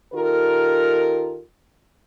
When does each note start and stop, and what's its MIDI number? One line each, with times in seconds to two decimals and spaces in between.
0.14 1.40 51
0.14 1.40 65
0.14 1.40 67
0.14 1.40 69
0.14 1.40 70